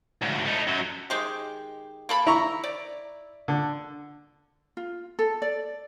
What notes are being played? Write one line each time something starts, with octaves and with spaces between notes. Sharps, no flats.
D2 G#2
A3 D#4
F#2 F#3
D#3 G#3 G4
A#3 A4 B5
E4 A#5 C#6
D5
D3
F4
A4
D5